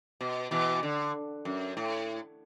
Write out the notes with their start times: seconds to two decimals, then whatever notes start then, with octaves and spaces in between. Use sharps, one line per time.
0.21 B2
0.51 B2 E3
0.83 D3
1.45 F#2
1.77 A2